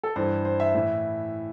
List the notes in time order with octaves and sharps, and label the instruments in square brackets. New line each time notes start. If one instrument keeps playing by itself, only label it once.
[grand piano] A4
G2 E3 C5
C5
E5
A2 E3